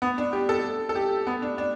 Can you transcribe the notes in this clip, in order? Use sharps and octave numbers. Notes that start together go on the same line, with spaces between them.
B3
D4
G4
A4
A4
G4
B3
D4
D4